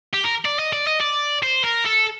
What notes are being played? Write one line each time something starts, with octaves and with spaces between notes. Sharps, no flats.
G4
A#4
D5
D#5
D5
D#5
D5
C5
A#4
A4